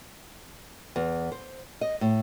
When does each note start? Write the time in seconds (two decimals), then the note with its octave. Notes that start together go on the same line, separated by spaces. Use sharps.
0.96 E2
1.32 C5
1.81 D#5
2.01 A2